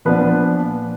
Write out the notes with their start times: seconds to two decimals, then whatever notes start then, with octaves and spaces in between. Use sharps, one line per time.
0.05 A#2 F3 B3 D4 B4